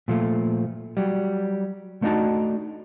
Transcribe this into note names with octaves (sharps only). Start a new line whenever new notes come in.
A#2 F3 A3
F#3 G3
A3 A#3 D4 D#4 F#4 A5